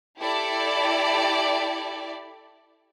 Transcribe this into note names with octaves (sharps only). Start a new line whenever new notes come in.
E4 G4 A4 D5